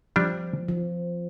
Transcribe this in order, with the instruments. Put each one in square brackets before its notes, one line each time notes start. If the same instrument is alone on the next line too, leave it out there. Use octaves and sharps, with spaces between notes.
[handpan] F3 [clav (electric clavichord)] G3 D4 G4
[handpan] F3